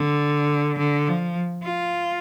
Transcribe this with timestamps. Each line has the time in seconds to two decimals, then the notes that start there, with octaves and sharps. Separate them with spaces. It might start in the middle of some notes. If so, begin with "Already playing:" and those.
Already playing: D3
0.78 D3
1.07 F3
1.63 F4